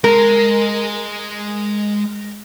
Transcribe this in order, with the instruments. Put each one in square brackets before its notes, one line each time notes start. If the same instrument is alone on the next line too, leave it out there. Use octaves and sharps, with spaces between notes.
[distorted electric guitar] G#3 [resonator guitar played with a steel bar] A#4